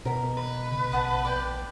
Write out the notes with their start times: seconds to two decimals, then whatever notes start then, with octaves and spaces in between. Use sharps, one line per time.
0.05 B2 A#4 B5
0.37 B4
0.71 C#3
0.92 A#1 D#5 F#5 A5
1.25 D5 G5